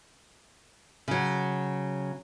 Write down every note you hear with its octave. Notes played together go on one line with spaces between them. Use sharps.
C#3 F#3